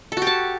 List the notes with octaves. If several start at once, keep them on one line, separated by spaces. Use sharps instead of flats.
F#4 G4 A4 A5